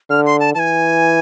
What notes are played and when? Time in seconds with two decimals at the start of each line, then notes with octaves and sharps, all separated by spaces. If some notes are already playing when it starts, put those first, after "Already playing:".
0.10 D3 F6
0.26 C6
0.40 A5
0.54 E3 G#5 A5